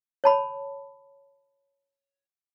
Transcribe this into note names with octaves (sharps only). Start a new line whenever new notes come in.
C#5 A5 B5